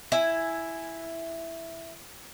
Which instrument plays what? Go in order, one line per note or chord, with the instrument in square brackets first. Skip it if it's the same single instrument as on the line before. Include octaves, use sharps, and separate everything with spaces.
[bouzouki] E4 G#5